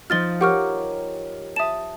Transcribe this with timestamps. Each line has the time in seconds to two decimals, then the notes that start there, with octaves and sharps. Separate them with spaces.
0.10 F3 D#4 F4 F6 A6 G7
0.41 G4 A#4 C#5 F#5 C#6 F6
1.56 E5 A5 D#6 E7